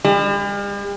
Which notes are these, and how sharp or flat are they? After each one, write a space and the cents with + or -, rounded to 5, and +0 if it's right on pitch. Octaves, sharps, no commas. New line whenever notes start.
G3 +45